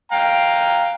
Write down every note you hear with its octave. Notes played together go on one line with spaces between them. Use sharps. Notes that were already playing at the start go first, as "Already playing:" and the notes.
F5 G5 A#5